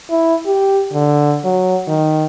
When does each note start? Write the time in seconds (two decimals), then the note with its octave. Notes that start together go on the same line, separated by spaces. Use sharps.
0.10 E4
0.46 G4
0.93 D3
1.45 F#3
1.88 D#3